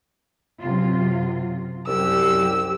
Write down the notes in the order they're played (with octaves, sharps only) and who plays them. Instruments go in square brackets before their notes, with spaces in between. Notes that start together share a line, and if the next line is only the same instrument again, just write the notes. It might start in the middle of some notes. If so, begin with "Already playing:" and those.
[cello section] F#2 C3 F4
[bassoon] C2 [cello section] F#2 F#3 G4 [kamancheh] E6